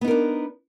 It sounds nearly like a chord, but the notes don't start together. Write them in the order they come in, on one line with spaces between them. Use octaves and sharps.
B3 D#4 A#4 D4